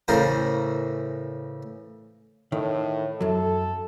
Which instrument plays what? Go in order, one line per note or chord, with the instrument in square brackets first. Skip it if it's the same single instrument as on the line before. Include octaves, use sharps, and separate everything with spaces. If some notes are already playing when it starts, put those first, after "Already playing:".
[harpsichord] A2 C#3 E3 A#4 C5 A#5
[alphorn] A2 [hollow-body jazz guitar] D#3
[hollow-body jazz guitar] F#2 F#3 [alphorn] A4